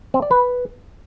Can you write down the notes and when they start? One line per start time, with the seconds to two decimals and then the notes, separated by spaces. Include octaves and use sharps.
0.14 C4
0.22 D5
0.31 B4